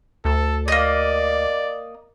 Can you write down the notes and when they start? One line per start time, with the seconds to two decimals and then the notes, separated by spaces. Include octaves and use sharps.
0.25 D2 A4
0.68 A#3 D5 D#5